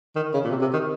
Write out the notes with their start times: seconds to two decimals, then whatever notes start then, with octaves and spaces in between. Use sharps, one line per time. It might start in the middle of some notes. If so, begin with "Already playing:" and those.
0.16 D#3
0.34 C#3
0.45 A#2
0.50 C3
0.62 C3
0.73 D#3